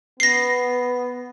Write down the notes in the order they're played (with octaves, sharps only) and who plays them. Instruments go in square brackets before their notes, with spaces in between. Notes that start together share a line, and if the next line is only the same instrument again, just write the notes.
[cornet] B3 [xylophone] A#6 C7